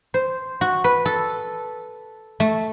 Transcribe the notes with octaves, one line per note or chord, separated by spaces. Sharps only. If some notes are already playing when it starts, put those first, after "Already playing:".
C5
F#4
B4
A4
A3